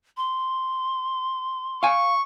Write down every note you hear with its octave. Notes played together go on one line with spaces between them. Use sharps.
C6
F5 G#5 C#6